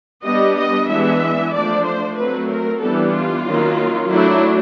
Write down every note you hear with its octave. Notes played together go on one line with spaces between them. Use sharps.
G3 B3 D4 D#5
D#5
E3 G#3 B3 D4 E5
F3 A3 D4 D5
C5
F#3 A3 C4 B4
A#4
E3 G3 B3 D4 A4
F4
D#3 F#3 A#3 C#4
F#3 A3 D4 E4